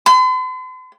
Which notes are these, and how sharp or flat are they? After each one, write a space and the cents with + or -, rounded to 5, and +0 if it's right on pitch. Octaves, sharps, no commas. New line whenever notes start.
C6 -45